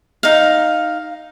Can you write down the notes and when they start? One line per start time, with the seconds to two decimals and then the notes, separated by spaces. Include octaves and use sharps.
0.23 D#4 F5